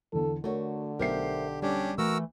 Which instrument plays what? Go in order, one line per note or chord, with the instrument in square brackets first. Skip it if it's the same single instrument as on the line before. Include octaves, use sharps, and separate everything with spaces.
[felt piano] E2 D3 [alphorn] A4
[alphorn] D3 [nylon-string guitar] A3 F#4 [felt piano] A#4 C#5
[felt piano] B1 C7 [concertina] G4 [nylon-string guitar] A#4 C5 E5
[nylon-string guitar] G3 [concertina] C#4 D4 G4
[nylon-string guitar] E3 A3 [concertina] F#4 A#4 E6